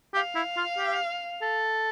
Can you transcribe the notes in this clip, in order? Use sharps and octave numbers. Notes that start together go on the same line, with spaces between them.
G4 F5
E4
F4
G4
A4